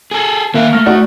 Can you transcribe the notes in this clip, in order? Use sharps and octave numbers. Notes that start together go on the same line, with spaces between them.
G#4 A4
D#3 A#3 E5
A3 F6 A#6
D#4 F#4 D5